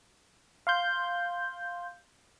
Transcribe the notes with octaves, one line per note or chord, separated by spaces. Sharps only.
F5 C6 G6